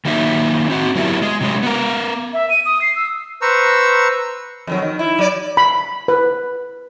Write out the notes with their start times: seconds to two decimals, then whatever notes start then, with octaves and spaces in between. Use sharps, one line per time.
0.05 D#3 F#3 A#3 D#4 E5
0.70 C4 F#4
0.95 F#3 B3 E4 G4 A#4 E5
1.22 G#3
1.40 C3 F#3 G#3
1.63 B3 A#4
2.33 E5
2.50 D#7
2.66 D#6
2.82 C7
2.96 E6
3.42 B4 C5 A#5 C#6 E6
4.67 F2 D#3 F#3
4.82 D#3
4.99 E4
5.19 F#3 D5
5.57 B5
6.08 B4